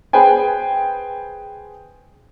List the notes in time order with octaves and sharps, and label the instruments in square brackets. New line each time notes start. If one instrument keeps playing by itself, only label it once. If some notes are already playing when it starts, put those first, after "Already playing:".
[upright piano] G#4 B4 C5 G5 G#5